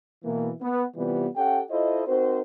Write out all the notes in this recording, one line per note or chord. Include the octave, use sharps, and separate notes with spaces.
B2 E3 A#3
B3
C3 E3 G3 B3 F4 G4
C#4 G4 A4 F#5 G5
E4 F4 A4 C5 D#5
C4 D#4 F#4 A#4 C5